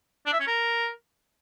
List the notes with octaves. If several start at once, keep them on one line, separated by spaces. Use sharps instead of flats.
D4
E5
C#4
A#4